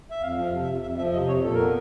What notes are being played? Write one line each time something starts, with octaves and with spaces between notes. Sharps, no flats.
E5
F2 F5
F3
F5
C3
E5
F2
F2 E5
F3 E5
C3 D#5
F2 C#5
A#2 A4
B3 A#4